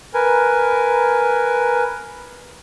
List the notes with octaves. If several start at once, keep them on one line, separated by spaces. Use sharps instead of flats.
A#4 B4 G#5